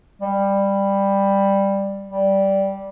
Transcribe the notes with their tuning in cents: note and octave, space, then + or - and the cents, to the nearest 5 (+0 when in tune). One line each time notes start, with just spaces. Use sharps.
G3 +10
G3 -10